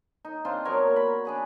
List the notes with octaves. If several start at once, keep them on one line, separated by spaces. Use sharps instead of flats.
D#4
C4 D4 F4 C5
F#3 B3 A#4 C#5
A#2
B5
D4 G#4 B4